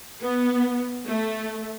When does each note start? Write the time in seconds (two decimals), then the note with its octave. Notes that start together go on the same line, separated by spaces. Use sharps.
0.21 B3
1.06 A3